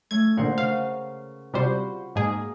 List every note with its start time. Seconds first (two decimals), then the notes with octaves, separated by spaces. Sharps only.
0.11 A3 C#4 G#6
0.37 A#2 D3 A#4 C5 F#5
0.58 C#3 F5
1.53 C3 G3 F4 F#4 C5 B5
2.15 G#2 A#3 G#4